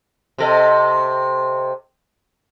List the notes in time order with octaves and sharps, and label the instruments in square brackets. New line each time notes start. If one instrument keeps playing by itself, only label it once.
[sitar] C3 A4 D#5